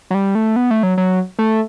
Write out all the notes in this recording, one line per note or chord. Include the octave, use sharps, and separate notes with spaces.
F#3
G3
A3
B3
A3
F#3
F#3
A3